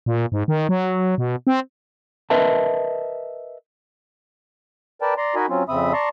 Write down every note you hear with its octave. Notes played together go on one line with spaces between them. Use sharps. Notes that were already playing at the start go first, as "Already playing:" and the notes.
A#2
G#2
D#3
F#3
B2
C4
A#4 B4 D#5 E5 A5
A#4 B4 D5 G5 A5
D5 A#5 C6
D#4 F#4 A#4 D#5 G#5 B5
F#3 C4 C#4 F4
F2 C#3 C4 E5 B5 D#6
D5 A5 A#5 C6 C#6